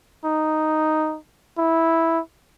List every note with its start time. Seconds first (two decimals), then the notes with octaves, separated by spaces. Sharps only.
0.25 D#4
1.58 E4